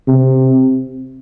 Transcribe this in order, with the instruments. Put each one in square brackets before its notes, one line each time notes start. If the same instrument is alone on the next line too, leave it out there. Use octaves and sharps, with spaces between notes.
[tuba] C3